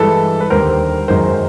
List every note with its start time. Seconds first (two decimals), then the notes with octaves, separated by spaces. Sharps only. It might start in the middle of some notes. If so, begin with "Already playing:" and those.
Already playing: G2 E3 G#3 A4 B4
0.40 B4
0.50 D#2 D3 G3 A#4 C5
1.08 F#2 D#3 G#3 A#4 C5